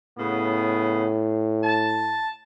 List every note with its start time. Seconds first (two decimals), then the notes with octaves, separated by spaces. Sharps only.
0.18 A2 C#3 B3
1.63 A5